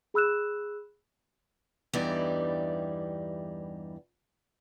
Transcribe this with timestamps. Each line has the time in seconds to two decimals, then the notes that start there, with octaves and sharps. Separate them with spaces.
0.14 G#4 B5 E6 F#6 E7
1.93 E2 G2 E3 G3 D#4 D5